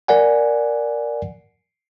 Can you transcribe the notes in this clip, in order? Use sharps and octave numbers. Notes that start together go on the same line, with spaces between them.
A#4 D5 F#5 G#5